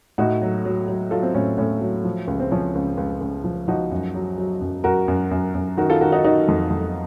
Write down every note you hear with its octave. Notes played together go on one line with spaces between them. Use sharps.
A2 D#4 F#4
F#3
F#3
F#3
F#3 F4 A4
C4
A2 C#4
A2 C#4
F#3
F3
C#2
C4
F3 C#4
C#2
C#2
C#2
F3
F3 D#4 F#4
F#2
F#3
F#3
F#2
F#2 F#4 A#4
F#2
F#2
F#2
D#3 F#4 A#4
F4 A4
D#3 F#4 A#4
D#4 F#4
D#3 D#4 F#4
F2
F2